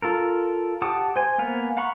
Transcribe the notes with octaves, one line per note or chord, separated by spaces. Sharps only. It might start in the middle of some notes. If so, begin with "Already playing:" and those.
F4 A4 A#4
G4 F#5 A5 D6 D#6
C5 G#5
A#3 B3 F5 G#5
F5 F#5 A#5 B5 C#6